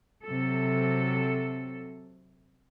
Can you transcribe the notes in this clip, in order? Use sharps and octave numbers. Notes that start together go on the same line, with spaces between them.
C3 F#3 A4